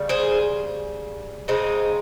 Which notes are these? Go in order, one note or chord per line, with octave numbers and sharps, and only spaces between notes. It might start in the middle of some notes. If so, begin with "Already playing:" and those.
Already playing: C#3 G3
G#4 C5
C#3 G#3 C4 D#4